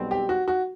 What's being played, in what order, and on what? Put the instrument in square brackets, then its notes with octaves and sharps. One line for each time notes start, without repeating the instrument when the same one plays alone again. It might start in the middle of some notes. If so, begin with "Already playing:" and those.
Already playing: [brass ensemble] B1 B2 G3 C4
[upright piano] G4
F#4
F#4